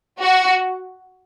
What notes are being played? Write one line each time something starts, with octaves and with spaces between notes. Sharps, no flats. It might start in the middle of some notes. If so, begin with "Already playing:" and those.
F#4